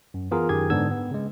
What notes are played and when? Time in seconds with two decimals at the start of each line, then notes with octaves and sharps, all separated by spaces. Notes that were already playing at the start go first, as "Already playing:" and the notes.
0.14 F#2
0.31 E3 B3 F4 G#4 A#4
0.49 F#2 D#3 G4 G#4 G#6
0.70 G#2 D3 B3 D4 E6 G#6
0.91 B3
1.11 C#3 G#3